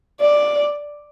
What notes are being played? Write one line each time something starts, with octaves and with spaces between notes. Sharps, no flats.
D5